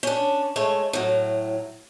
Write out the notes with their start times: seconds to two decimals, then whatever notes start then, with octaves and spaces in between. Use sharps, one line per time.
0.03 C#4 D4
0.56 G#3 A3 C#5
0.93 A2 F#3